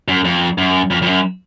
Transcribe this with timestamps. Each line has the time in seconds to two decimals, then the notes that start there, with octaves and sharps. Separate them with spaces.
0.08 F#2
0.25 F2
0.58 F#2
0.91 F2
1.02 F2
1.07 F#2